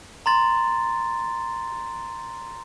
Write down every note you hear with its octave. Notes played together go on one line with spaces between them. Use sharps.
A#5 C6 A6